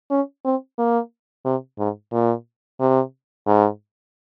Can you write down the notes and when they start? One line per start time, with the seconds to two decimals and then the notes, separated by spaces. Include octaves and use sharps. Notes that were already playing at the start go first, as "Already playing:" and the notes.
0.11 C#4
0.45 C4
0.78 A#3
1.45 C3
1.79 G#2
2.12 A#2
2.80 C3
3.47 G#2